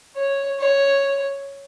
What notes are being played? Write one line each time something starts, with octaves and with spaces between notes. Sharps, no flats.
C#5
C#5